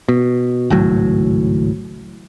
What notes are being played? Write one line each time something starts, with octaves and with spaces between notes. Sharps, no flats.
B2
G#1 C#2 A2 F#3